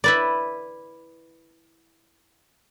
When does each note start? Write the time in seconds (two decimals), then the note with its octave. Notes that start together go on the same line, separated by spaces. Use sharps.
0.04 E4 B4 D5